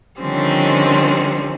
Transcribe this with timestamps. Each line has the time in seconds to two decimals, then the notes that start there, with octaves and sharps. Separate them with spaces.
0.20 D3 D#3 F3 G3 C4 C#4